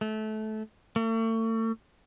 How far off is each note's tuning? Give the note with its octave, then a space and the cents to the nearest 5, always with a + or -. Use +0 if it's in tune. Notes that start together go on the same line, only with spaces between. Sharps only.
A3 -20
A3 +40